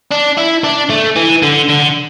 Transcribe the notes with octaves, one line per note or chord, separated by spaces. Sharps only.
D4
E4
D4
A3
E3
D3
D3